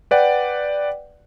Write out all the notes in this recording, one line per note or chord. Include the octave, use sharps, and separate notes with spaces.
B4 D5 F#5 G5